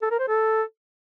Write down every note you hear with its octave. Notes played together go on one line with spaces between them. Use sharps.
A4
A#4
C5
A4